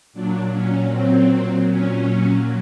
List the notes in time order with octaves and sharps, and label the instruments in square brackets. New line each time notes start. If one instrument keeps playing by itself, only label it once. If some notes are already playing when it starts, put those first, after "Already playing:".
[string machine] A#2 F#3 D4
C#4
C4
C#4